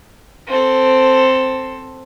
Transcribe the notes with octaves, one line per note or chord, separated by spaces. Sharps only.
C4 A4